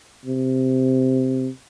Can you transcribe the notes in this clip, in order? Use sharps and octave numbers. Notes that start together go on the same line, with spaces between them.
C3